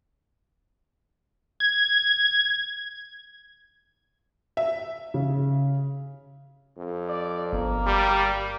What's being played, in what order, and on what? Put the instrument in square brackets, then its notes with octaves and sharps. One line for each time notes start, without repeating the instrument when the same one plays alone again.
[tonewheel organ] G#6
[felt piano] E5
C#3
[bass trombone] F2
[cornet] D5
[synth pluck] G1 [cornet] A#3
[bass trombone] G3